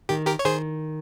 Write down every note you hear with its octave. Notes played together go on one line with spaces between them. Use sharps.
D#3 G4
G4 A#4
C#5
D#3 G#4 C5